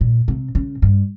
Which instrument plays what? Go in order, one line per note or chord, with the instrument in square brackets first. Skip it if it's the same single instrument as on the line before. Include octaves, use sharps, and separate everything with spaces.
[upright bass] A#2
C3
C#3
G2